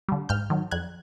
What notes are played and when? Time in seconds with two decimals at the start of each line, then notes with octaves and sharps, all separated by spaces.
0.09 D3 G3
0.29 G#2 F6 G6
0.50 D#3 F#3
0.71 F2 F#6 G#6